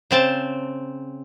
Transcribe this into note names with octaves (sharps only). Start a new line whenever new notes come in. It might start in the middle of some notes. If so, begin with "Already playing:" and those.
C#3 C4 A5